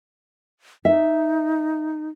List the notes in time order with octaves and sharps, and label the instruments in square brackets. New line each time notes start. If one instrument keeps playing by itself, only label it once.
[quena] D#4 [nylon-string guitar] E5